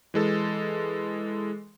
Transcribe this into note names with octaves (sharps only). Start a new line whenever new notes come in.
E3 G#3 A4